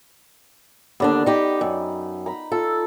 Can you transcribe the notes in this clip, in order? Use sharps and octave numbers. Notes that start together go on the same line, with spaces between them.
D#2 D3 B3 D4 D5
D#4 G4 B5 D6
F#2 D#4
A#5 B5
F4 A4